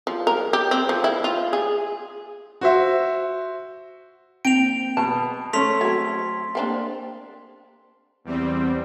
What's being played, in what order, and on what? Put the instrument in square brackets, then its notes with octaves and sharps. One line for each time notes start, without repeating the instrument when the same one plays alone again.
[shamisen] F3
A#4
G4
C4
F3
E4
F4
G#4
[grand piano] F#4 C5 E5
[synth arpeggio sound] A#3 C4 [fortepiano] G5 [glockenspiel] D7 F7
[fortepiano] B2 [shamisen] A5
[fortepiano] A3 C#4 [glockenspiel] C6 B6 F7
[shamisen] F#3 C4 [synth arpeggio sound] G#6
[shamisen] A#3 C4 D4
[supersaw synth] E2 G3 C4